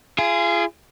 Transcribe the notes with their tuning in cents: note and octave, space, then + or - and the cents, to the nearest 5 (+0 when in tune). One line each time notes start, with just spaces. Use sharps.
F4 -35 G#4 +0